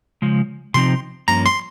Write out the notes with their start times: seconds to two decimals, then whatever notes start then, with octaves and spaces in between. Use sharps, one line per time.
0.22 C#3 F3 G#3
0.74 C3 F3 C4 D#4 C6
1.28 G2 F3 A#3 C#4 A#5
1.46 C6